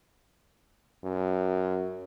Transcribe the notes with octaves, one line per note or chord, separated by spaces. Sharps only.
F#2